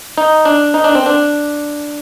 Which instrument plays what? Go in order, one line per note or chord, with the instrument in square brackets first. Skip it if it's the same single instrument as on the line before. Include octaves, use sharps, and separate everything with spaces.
[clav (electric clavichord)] D#4
D4
D#4
D4
C4
D4